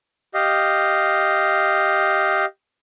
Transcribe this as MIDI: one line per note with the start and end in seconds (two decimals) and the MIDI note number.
0.34 2.45 67
0.34 2.45 75
0.34 2.45 77